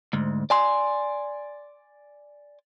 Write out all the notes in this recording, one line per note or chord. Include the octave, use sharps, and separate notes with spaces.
D2 G#2
D5 G#5 C6